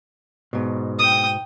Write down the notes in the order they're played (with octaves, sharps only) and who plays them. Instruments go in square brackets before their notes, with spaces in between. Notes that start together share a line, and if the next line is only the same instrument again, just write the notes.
[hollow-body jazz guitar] G#2 B2
[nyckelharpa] G5 D#6